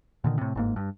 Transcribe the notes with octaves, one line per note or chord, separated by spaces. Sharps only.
A#2 D3 D#3
A2 C3
G1 G#2 A#3
G2